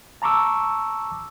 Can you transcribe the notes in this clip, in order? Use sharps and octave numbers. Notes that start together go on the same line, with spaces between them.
A5 A#5 C#6 D6 E6